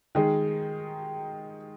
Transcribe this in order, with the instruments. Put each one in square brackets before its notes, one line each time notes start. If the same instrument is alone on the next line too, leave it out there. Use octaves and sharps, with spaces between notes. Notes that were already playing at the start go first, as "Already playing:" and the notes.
[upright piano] D#3 G#3 D#4 G#4